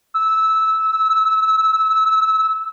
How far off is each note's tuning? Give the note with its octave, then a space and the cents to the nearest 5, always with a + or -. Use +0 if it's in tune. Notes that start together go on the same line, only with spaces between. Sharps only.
E6 -15